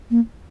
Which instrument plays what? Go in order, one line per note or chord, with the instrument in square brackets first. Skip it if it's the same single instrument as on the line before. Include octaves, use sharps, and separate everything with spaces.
[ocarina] A#3